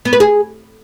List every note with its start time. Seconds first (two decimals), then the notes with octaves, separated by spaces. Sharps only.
0.05 B3
0.13 B4
0.20 G#4